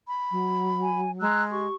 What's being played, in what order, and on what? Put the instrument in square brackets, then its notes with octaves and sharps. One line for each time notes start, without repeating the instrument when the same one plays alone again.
[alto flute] B5
[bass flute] F#3
[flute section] G#5
[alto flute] G#3 [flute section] A#5 E6 F#6
[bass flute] G4 [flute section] C#6